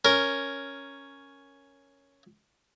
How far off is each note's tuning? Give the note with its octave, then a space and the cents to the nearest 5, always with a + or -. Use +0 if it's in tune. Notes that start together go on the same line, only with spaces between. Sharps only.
C#4 +0 A#4 +0